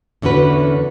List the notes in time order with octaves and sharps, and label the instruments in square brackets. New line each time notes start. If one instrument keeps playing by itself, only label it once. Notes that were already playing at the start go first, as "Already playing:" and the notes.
[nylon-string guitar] E2 D3 C#4 F#4 B4